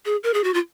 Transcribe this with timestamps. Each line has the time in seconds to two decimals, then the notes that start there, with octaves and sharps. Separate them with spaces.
0.05 G#4
0.23 A#4
0.34 G#4
0.44 F#4
0.54 F4